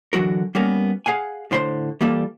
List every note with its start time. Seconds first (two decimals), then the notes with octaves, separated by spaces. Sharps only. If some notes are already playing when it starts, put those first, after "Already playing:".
0.13 D3 E3 F#3 F#4 A#4
0.55 G3 A#3 B3 C#4 A#4
1.06 G#4 F5 F#5 G#5
1.51 A2 D3 C5 B5 C6
2.01 E3 G3 A#3 F4 A4